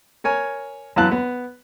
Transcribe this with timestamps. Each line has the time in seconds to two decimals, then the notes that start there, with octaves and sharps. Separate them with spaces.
0.24 A#4 C#5 G#5
0.96 F#2 E3 B3 F5 A5 F#6
1.11 B3